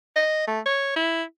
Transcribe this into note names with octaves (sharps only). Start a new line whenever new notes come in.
D#5
A3
C#5
E4